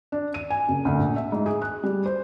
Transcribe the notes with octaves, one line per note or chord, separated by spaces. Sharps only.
D4
D#7
G#5
F#1
D2
A#1
E5
G#2
G#4
F#6
G3
C5